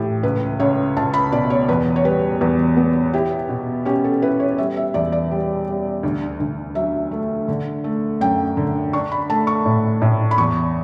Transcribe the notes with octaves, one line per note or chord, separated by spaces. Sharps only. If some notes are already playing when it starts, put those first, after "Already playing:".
Already playing: A2 E3 G4 A4
C#2 B4
C#2 C#5
C#2 A5
B5
B2 D5
C#5
E2 B4
C#5
G3 B4
E2 B4
B3
E4 G4
B2
C#4 G4
A4
E4 B4
C#5
G3 E5
E5
E2 D5
D5
G3
G3
D2
D2
F#3 E5
A3
D3
A3
F#2 G5
D3
D4 C#6
B5
A3 A5
C#6
A2
A2
B5
E2 C#6